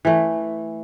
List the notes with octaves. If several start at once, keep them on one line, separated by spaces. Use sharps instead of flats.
E3 A3